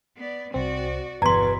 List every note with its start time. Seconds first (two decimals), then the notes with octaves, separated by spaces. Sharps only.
0.17 B3 D5
0.54 C2 C4 F#4 D5
1.22 G1 E2 B2 B4 A#5 C6 G#6